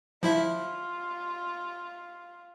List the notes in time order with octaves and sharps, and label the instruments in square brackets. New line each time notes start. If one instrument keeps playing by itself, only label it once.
[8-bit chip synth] F3 E4 E5 [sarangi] F4